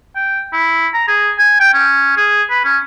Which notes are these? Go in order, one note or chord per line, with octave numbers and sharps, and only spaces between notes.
G5
E4
A#5
G#4
G#5
G5
C#4
G#4
B4
C#4